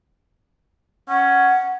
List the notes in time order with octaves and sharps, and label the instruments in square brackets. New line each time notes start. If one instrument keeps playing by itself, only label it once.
[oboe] C#4 [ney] F#5